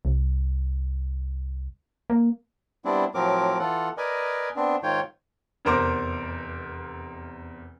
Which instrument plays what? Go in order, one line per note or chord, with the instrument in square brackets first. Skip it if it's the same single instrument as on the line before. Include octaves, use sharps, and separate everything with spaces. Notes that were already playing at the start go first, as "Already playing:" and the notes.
[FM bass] C2
A#3
[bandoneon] G3 B3 C4 D4 E4
A2 F3 F#3 C4 A#4 D6
E3 F4 A4 F#5
A#4 B4 D5 D#5 G#5
B3 C4 D4
G#2 D#3 F4 C#5 G5
[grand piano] F1 E2 A#4 C5 D6